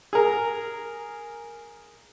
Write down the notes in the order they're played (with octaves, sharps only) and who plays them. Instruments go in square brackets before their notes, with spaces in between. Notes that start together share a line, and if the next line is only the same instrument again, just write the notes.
[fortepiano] G#4 A#4